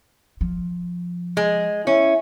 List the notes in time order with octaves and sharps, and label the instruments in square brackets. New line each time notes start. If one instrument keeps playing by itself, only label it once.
[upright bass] F3
[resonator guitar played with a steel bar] G#3
[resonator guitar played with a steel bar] C#4 [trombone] E4